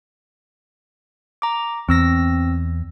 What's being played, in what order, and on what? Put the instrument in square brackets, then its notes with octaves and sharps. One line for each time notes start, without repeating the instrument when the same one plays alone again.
[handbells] A#5 D6
[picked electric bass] E2 [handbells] C4 E6 A#6